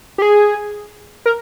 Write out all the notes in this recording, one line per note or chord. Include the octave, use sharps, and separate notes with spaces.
G4
G#4
A#4